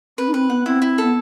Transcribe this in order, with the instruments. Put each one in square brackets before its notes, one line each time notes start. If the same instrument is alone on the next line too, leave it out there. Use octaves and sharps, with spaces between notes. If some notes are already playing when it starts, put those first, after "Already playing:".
[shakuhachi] C4 [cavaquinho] B4
[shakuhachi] D#4
[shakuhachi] C4 [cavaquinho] B4
[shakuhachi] B3 [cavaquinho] F#5
[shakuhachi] C4 [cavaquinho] E4
[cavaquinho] E4
[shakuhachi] B3 [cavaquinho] A4